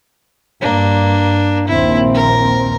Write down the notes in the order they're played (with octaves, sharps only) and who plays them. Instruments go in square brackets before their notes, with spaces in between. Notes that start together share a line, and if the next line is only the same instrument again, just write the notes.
[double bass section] G2 [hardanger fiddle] A#3 D4
[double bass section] A#1 D#2 C4 [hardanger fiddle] E4
[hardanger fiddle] A#4